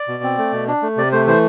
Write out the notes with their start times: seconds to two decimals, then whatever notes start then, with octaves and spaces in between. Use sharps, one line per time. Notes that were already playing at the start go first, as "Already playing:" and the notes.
Already playing: D5
0.08 B2
0.23 C4
0.38 A3
0.53 B2
0.68 D4
0.82 A3
0.97 C3 D5
1.12 A3 C5
1.27 E3 C5